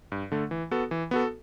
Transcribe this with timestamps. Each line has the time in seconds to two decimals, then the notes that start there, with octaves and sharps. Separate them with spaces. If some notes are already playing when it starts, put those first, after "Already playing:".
0.12 G2
0.32 D3 A3
0.51 E3
0.71 B3 F#4 A4
0.91 E3
1.11 B3 F#4 A4